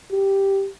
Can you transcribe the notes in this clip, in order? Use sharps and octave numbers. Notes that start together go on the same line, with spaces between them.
G4